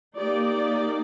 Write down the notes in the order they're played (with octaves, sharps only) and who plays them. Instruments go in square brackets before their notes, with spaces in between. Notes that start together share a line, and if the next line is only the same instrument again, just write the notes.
[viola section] A#3 D#4 G4 D5